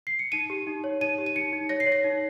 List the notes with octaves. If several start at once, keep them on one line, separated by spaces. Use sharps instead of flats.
C7
C#7
D#4 D#7
G4
D#4
C#5
D#4 D#7
G4
D#7
D#4 C#7
D#4
C#5 A#6
C7
C#5
A#6
D#4